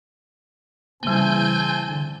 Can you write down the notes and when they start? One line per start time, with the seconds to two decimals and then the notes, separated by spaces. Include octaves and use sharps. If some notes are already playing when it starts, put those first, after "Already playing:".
1.03 C#3 E3 G3 A#3 C4 G#5 A5 G6
1.86 D3